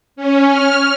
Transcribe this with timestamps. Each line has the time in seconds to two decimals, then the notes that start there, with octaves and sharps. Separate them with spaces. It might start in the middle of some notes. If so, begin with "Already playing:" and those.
0.16 C#4
0.47 F6